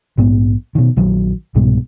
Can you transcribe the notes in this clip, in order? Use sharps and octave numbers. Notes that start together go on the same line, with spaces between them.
A#1 G#2 B3
B2 D#3
A#1 D#3 F#3
C2 G#2 B2 G3